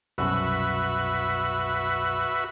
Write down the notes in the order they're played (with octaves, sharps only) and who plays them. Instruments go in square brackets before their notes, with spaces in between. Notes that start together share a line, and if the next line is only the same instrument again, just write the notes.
[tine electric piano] C2 F#2 B2 [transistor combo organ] F#4 B4 E5